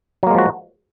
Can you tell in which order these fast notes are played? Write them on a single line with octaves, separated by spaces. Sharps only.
F#3 A#3 G#3 F3 F#4